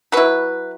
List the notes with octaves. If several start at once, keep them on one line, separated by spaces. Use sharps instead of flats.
F#3 E4 B4